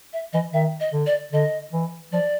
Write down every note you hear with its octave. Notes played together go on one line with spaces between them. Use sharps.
E5
E3 D#5
D#3 E5
D#5
D3
D5
D3 D#5
E3
F3 D5